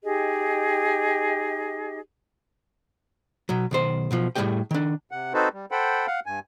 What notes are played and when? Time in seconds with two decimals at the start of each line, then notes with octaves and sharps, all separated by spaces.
0.03 D#4 G4 G#4 D#5
3.49 B2 F#3
3.71 B1 D#3 C5
4.11 B1 B2 F3
4.35 A2 G3 A#3 G4 G#4 G5
4.71 D#3 D4
5.11 C3 F#5
5.34 C4 D#4 F#4 A4 B4 C5
5.53 G3
5.71 A4 C5 F#5 G5 B5
6.07 F5 F#5
6.26 G2 G#5